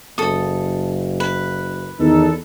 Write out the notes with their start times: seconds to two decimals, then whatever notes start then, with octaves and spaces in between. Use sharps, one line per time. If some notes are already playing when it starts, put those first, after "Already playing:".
0.18 F#1 A4 D#6
1.20 B4
2.00 E2 D#3 D#4 A4